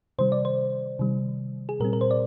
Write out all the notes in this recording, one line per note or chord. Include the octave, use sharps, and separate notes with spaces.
C3 D#3 G3 C5
D5
C5
C3 D#3 G3
G#4
A#2 G3 C4 A#4
A#4
C5
D5